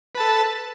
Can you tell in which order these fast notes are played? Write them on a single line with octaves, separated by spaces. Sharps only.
B4 A5 A4